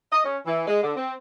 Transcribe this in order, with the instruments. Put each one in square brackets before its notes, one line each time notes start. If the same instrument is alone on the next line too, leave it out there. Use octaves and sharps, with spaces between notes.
[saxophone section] D#5
C#4
E3
G#3
D3
C4